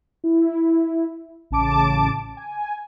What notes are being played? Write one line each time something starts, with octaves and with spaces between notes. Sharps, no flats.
E4
A1 C#3 A5 D6 D7
G#5